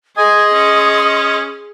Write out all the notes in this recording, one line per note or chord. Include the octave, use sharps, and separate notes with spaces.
G#4 D#5 G#5 C6 D#6
C#4